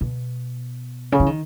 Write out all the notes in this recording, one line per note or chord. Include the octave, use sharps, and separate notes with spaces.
B2
C#3
E3
D#3